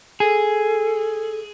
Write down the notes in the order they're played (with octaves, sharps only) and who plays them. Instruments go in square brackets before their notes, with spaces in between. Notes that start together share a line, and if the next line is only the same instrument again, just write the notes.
[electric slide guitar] G#4 [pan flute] A4